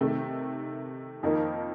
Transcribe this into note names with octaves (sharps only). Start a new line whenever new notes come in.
C3 D#3 A3
F2 D#3 A#3 D#4 A#4